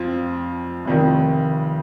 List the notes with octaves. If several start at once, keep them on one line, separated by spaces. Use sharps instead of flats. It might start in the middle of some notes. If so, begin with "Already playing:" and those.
Already playing: F2 F3 C4 F4
F1 F2 D#3